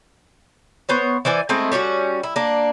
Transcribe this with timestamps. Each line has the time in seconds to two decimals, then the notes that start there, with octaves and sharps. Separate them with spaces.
0.89 B3 C5 C#5
1.25 E3 C5 D5 G#5
1.49 G#3 A3 C4 E4
1.72 G3 C#4 F4 F#4
2.23 E4
2.36 A#3 D4